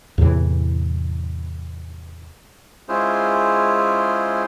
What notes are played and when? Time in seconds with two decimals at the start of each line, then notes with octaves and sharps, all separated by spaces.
0.18 E2 A2 C3 E3
2.89 G#3 C#4 E4 F4 G#4 C5